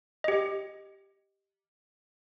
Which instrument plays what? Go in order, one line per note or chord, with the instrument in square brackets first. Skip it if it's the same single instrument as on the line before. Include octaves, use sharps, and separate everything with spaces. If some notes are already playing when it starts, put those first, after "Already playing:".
[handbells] G4 D#5